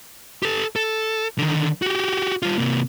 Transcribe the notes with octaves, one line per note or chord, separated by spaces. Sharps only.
G4 A4
A4
D3 D#3
F#4 G4
G3 F4
C3 A#3